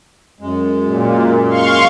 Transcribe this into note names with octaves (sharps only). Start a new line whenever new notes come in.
F#2 G#3
A#2
F5 C6 C#6